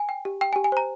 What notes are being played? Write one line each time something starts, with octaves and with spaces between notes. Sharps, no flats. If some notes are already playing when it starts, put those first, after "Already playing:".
Already playing: G#5
G5
G4
G5
G#5
G4
G#5
C5 A#5